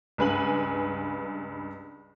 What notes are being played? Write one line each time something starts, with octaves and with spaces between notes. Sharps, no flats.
C#2 G2 B4 G#5 F#7